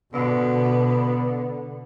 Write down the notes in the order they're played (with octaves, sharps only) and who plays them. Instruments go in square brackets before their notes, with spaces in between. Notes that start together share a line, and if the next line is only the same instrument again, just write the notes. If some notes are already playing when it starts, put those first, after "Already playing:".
[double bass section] B2 [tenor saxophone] D3 [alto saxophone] B3